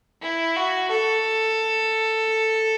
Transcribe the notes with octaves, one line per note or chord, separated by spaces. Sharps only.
E4
F#4
A4